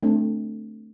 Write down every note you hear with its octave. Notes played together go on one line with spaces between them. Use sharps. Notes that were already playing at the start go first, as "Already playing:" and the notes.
A3 C4 D4